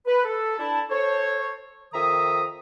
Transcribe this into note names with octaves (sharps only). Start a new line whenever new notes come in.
B4
A4
D4 E4 A5
A4 C5 C#5
F2 D#3 E5 A#5 D#6